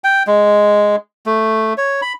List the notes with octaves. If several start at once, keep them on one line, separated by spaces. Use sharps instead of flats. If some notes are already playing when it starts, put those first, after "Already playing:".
G5
G#3
A3
C#5
B5